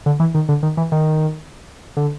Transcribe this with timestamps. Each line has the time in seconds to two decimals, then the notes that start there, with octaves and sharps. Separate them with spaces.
0.06 D3
0.20 E3
0.35 D#3
0.49 D3
0.63 D#3
0.77 E3
0.92 D#3
1.97 D3